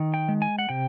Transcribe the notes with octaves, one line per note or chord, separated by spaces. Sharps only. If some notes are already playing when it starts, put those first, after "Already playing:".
Already playing: D#3
G5
G#3
G#5
F#5
C3 G5